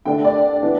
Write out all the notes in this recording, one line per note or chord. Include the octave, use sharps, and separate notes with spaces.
D3 A3 D4 G5
D5
E3 B3 D4